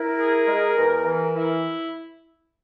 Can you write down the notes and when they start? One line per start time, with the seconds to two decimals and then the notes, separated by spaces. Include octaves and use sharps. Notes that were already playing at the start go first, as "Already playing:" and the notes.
Already playing: E4 A#4
0.17 G#4
0.46 G#3
0.76 E2
1.04 E3
1.35 E4